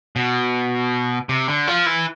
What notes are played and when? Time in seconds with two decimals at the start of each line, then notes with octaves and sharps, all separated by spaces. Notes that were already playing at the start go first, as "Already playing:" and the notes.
0.16 B2
1.29 C3
1.48 D3
1.67 F3
1.86 E3